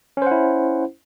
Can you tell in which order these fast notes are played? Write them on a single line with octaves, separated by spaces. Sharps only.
C#4 C5 F#5 E4